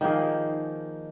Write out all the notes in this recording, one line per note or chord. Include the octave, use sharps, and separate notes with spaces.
D#3 F3 A#3 G#4